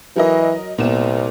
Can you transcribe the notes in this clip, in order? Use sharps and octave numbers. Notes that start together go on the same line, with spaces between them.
E3 F#3 A#4 D#5
C2 A#2 B3 E7